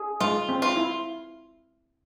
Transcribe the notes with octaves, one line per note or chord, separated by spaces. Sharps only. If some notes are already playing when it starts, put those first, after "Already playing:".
Already playing: G#4
G#3 F4
C4
F4
E4